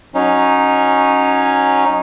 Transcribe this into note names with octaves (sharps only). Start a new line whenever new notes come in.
F#3 C#4 D#4